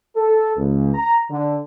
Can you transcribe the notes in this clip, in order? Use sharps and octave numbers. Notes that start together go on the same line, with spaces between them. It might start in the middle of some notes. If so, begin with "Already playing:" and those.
A4
C#2
A#5
D3